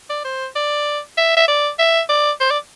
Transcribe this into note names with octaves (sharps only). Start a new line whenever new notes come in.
D5
C5
D5
E5
E5
D5
E5
D5
C5
D5